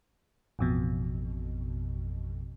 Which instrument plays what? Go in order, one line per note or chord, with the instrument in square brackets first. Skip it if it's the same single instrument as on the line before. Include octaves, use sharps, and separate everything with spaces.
[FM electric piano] A1 F2 B2